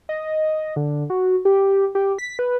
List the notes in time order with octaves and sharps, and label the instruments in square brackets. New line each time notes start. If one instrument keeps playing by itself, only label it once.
[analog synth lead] D#5
D3
F#4
G4
G4
B6
B4